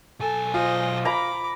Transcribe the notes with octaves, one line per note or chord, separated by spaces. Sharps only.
B1 A4 G#5
F4 C5 D#5
A#5 B5 D6